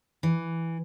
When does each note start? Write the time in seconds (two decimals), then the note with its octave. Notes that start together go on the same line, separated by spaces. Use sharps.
0.23 E3